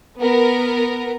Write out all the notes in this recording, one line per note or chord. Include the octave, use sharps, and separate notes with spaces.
B3 A#4